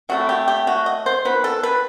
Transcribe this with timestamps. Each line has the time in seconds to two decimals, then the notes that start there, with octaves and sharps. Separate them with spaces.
0.09 C3 F#3 A3 E4 F#4
0.29 G4
0.48 G4
0.67 F#4
0.86 D#5
1.06 C5
1.25 D#3 F#3 B3 B4
1.44 A4
1.63 B4